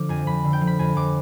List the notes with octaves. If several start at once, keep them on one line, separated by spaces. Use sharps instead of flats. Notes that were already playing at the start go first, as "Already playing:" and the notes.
Already playing: D3 F3 D6
F2 G#5
F2 B5
D3
G5
F3
B5
F2 G#5
F2 D6